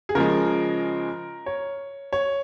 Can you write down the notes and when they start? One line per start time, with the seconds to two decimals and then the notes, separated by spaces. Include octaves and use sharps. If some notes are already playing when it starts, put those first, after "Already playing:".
0.09 G#4
0.15 C#3 F3 G#3 A#4
1.46 C#5
2.13 C#5